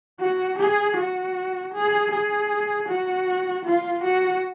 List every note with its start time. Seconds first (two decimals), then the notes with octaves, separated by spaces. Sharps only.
0.20 F#4
0.58 G#4
0.97 F#4
1.74 G#4
2.11 G#4
2.88 F#4
3.65 F4
4.03 F#4